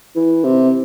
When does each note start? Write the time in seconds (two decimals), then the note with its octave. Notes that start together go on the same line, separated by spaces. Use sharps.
0.16 E3
0.44 C3